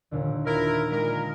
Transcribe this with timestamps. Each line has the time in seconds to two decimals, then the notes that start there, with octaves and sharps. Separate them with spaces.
0.11 D#2 A#2 D3
0.46 E4 F4 A#4 E5 A#5
0.91 A#2 G#3 A#4 D#6